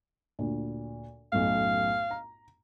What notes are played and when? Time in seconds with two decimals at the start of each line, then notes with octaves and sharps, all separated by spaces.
0.39 D2 A#2
1.33 B1 F#2 A2 F5
2.11 A#5